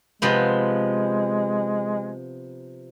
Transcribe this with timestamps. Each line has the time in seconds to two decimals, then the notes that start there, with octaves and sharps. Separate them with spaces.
0.22 C3 F3 G#3 B3